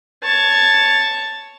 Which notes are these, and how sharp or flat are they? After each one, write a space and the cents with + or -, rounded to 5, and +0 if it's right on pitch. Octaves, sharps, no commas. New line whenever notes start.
C#5 +5 A5 +0